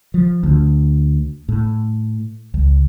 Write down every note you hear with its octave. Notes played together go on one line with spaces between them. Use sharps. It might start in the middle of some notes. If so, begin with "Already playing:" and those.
F3
D2
A2
C#2